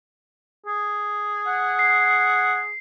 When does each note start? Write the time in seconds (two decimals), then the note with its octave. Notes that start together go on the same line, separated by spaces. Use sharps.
0.67 G#4
1.47 F#5
1.79 C7